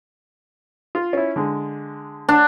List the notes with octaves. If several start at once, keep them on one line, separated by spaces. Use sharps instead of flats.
F4
C#4 E4
D3 G#3
D4